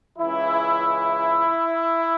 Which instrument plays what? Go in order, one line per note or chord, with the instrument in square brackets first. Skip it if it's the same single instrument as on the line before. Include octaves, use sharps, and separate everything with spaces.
[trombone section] C#2 C#3 E3 E4